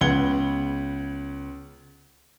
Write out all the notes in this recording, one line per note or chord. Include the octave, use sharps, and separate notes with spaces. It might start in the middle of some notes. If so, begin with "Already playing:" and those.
C#2 B3 F#5 G#6 G7